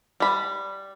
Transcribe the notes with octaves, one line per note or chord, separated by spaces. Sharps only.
G3 B5